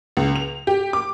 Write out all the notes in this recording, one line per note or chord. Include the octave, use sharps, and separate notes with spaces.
C#2
F7
G4
D6